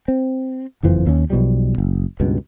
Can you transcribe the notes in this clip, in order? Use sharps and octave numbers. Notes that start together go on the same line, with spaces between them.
C4
F#1 F2 E3 F3
D#2 C#4
B1 B2 F3 G3
F#1
C#2 G2 B2